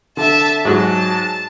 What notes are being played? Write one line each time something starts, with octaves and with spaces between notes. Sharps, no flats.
D3 E5 A5
G#2 F#3 A5